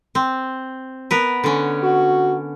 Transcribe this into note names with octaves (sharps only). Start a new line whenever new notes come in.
C4
B3 A#4 B4
D3 C#4
F#4